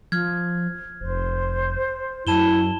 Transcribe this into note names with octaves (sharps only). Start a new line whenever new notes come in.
F3 F6 G#6
F1 C5
F#2 E4 A5 E7 G7